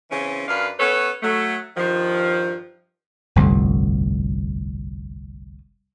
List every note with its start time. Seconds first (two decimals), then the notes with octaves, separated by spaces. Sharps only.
0.10 C#3 E3 C4 C#4
0.47 F#2 D4 B4 F5
0.79 B3 C#4 A4 B4 C#5
1.23 F#3 A3
1.76 G2 D#3 F3
3.36 G1 C2 F2 A2